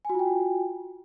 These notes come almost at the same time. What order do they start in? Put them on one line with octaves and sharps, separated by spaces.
G#5 F#4 F4 G5